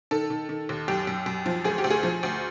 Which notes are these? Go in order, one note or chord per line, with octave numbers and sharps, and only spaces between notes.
D#3 A4
D#3
D#3
D#2
F#2 G4
F#2
F#2
F3
D2 G#4
G4
D2
G#4
F3
D2